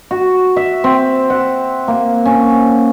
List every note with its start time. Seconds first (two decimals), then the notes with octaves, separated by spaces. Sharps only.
0.11 F#4
0.57 E5
0.84 C4
1.30 F#5
1.88 A#3
2.25 C#4